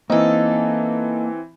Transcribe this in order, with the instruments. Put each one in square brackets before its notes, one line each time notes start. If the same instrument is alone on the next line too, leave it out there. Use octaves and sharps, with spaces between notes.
[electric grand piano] E3 C4 [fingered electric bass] A#3 [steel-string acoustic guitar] D#4 A4